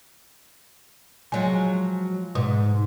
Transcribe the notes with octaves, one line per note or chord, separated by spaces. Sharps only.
F3 F#3 G#3 G#5
G#2 B2